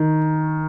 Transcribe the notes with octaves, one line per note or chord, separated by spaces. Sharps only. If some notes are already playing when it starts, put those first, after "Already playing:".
Already playing: D#3